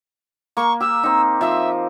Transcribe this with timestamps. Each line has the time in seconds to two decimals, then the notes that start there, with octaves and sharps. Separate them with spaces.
0.57 A#3 C#6
0.80 G4 E6
1.03 C4 D#4
1.41 F3 C4 E5